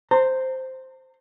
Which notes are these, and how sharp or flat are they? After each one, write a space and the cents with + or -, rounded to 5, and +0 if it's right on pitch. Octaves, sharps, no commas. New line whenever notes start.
C5 +0 A#5 -40